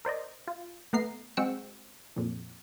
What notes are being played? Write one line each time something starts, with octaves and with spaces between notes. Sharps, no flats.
A#4 C5 D5 D#5
F4
A3 B3 A#5 C7
G#3 C4 F#4 G5 E6 C#7
F2 A#2